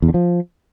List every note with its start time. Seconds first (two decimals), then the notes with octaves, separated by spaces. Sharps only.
0.02 E2
0.08 D3
0.14 F3